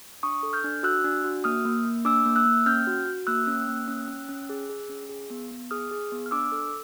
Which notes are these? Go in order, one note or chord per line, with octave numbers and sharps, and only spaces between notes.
D4 C#6 D#6
A4
F6 G6
D4
F#4 E6 F#6
D4
F#4
A#3 D#6 F6
A#3
A#3
D4 D6 E6
A#3
E6 F#6
A#3
C#4 F6 G6
F#4
F#4
A#3 E6 F#6
C#4
A#3
C#4
C#4
C#4
G#4
G#4
C#4
G#4
B3
B3
G#4 D#6 F6
G#4
B3
F6
D4 D6 E6
A4